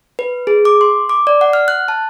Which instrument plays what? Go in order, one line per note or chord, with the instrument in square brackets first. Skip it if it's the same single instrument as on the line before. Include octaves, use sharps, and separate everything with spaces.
[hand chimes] B4
G#4
D6
C6
D6
D5
F#5
F6
F#6
A5